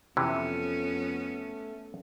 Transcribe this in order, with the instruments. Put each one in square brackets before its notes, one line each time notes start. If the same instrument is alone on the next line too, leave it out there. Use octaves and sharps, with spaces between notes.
[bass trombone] F2 [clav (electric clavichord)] C3 E3 [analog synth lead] A3 [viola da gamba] B3 C#4